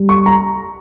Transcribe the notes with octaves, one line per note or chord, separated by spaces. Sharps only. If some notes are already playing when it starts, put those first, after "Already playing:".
Already playing: G3
C#6
A#5